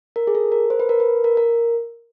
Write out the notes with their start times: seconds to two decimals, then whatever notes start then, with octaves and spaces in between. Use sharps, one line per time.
0.16 A#4
0.27 G#4
0.35 A4
0.52 A#4
0.70 C5
0.80 B4
0.89 A#4
1.00 B4
1.24 A#4
1.37 A#4